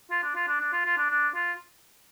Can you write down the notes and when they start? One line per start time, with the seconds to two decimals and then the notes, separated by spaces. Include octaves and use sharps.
0.11 F4
0.23 D4
0.35 F4
0.48 D4
0.60 D4
0.73 F4
0.85 F4
0.98 D4
1.10 D4
1.35 F4